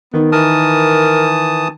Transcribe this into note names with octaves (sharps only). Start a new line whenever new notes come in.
D#3 B3
E3 A#4 A5 D#6